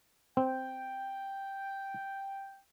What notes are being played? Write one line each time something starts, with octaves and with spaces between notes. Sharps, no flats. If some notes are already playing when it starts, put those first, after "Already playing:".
C4 G5